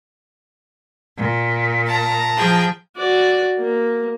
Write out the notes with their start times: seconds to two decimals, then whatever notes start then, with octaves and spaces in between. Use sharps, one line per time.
1.17 A#2
1.86 A5 A#5
2.36 F3 G#4 G5
2.97 F#4 D5
3.59 A#3